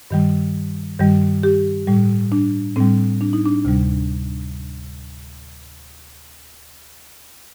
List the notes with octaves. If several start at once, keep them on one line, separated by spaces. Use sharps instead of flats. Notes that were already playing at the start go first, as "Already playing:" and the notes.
G2 D#3 G3
G2 D#3 G3
G4
A2 G3
D4
A2 G3 C4
D4
D#4
D4
D2 C3 G3